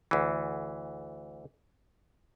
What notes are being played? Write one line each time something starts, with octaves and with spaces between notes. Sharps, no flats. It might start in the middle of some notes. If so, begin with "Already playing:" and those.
D2 E3